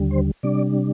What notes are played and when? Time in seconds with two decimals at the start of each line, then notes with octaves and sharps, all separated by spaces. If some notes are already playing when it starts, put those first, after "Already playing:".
Already playing: D#2 D3 G3
0.11 C5
0.43 C3 G3 D4 D5